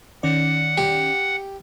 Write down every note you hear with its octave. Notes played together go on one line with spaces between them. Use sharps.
D#3 C#4 D5 F#5
G4